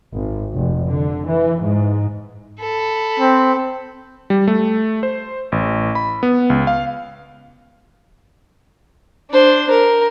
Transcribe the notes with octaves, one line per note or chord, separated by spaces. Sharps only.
G#1
F1
D3
E3
G#2
A4 B5
C4
G3
A3
C5
A1
B5
B3
C#2
F5
D4 C5
A#4